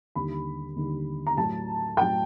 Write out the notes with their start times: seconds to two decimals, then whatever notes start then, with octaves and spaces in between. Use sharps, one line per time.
0.15 D#2 D3 G3 B5
0.76 D#2 D3 G3
1.27 A#5
1.37 A2 F#3 A5
1.97 A2 F#3 G5